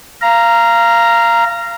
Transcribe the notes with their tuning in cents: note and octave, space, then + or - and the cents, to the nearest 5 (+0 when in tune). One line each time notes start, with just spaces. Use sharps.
F5 -20 A#5 +0